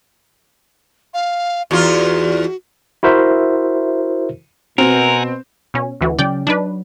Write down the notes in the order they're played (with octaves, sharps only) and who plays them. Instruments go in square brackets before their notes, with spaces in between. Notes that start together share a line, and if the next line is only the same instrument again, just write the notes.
[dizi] F5
[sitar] E2 F4 [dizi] F#4
[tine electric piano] E4 F#4 A#4 C5 E5
[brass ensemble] B2 [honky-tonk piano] C4 [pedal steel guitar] A#4 [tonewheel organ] F#5 G#5 A#5
[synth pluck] B2 C#4
D2 E3 F#4
[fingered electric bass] C#3 F#3 C#4 [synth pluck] D5 G5
[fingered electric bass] F#3 [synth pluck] D4 D#4 B4